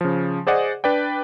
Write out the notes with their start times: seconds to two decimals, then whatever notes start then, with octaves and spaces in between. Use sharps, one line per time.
0.01 C#3 F3
0.47 G#4 C5 D5 D#5 F#5
0.84 D4 B4 D5 G5